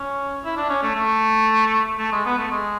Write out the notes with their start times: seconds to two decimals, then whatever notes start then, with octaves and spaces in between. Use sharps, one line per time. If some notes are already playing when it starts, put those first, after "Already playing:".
Already playing: C#4
0.44 E4
0.57 D4
0.69 C#4
0.82 A3
0.95 A3
1.99 A3
2.12 G#3
2.25 B3
2.38 A3
2.51 G#3